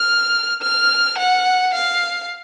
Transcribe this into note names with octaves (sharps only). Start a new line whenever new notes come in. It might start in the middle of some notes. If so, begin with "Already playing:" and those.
Already playing: F6
F6
F#5
F5